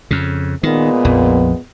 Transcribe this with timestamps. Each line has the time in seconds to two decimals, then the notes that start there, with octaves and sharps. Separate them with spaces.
0.11 F2 C#3
0.63 A#2 D#3 G#3 B3
1.05 A#1 F2